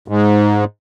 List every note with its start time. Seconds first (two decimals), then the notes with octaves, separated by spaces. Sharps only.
0.08 G#2